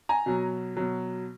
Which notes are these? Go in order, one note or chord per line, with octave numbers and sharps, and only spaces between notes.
G#5 A#5
B2 F#3
B2 F#3